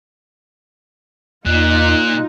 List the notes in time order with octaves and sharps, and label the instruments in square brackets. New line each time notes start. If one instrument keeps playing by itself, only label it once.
[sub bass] E2 [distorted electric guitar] A#2 [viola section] D#4 F4 [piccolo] F#6